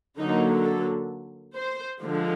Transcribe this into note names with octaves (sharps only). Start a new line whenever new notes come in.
D3 F#3 A#3 D#4
A4
C5
D3 F3 G#3